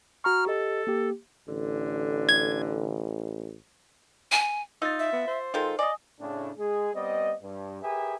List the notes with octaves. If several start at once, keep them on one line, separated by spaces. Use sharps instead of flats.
F#4 A#5 C#6 F6
G4 A4 D#5
A#3 G4
A1 D3
G#6
G#5
D#4 F4 E6 A6
E5
B3
C5
D#3 G#3 F4 A4
D5 D#5 G#5 D#6
A2 C#3 D4
G#3 G#4
G3 B3 C4 D5 D#5
G2
G4 G#4 A#4 B4 E5 G#5